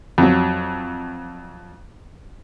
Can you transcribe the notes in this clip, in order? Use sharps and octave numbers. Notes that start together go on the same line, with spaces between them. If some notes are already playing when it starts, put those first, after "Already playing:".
F2 F#3